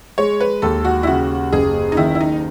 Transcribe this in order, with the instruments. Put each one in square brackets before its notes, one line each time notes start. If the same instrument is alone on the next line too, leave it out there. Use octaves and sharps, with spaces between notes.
[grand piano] G#3 [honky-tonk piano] C#5
[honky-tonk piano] B4
[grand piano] D#2 [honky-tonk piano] A4
[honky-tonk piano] F#4
E4
[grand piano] C#3 [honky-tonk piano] F#4
[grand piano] F#1 [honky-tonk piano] G#4
[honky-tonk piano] D#4
[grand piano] D#3 [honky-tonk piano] E4
[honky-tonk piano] E4
D#4